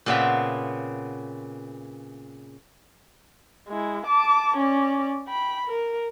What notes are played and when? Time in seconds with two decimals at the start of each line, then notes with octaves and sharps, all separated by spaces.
0.06 A#2 C#3 B3 C4 E5 B5
3.68 G#3 E4
4.06 A5 D6
4.57 C#4 D5
5.27 G5 B5
5.67 A#4